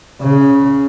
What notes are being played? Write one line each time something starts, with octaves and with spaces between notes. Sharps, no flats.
C#3